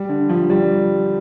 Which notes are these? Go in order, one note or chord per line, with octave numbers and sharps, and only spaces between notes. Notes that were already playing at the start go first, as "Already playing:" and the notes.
Already playing: G3
D3
F3
G3